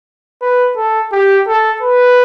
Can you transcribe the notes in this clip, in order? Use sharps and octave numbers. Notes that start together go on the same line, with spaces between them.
B4
A4
G4
A4
B4